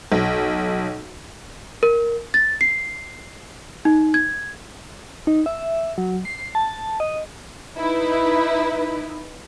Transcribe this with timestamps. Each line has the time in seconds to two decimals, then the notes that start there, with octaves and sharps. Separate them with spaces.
0.12 B1
1.83 A#4
2.34 A6
2.61 C7
3.85 D#4
4.14 G#6
5.27 D#4
5.46 E5
5.98 F#3
6.25 C7
6.55 A5
7.00 D#5
7.77 D#4 E4 B4